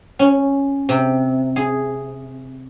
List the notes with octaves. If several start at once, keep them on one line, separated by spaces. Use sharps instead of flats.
C#4
C3
G#4